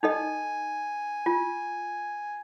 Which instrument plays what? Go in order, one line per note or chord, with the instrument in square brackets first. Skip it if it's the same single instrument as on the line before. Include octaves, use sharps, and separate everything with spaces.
[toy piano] D#4 A4 D#5 [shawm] G#5
[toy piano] F4